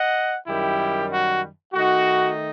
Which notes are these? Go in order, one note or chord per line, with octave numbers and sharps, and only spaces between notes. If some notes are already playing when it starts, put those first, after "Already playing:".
Already playing: D#5 F#5
F#2 D#3 G3 E4 G4
F#4
D#3 A3 D#4 F#4